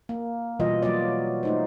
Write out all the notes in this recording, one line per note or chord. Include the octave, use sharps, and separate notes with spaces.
A#3
B2 E3 G3 F4 D#5
F#3 A#3 F4 D5
A3 D#4 C5